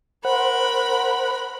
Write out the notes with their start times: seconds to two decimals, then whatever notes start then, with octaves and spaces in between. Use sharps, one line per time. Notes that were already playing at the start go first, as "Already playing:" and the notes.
0.25 A#4 C5 F#5 B5